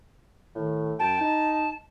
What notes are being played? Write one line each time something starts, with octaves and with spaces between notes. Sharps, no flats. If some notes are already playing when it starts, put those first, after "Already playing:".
A2 D#3
F#2 G5 A5
D#4